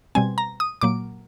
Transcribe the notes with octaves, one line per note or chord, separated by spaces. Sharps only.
B2 G3 C4 G#5
A#5
D#6
A#2 F#3 A#3 D6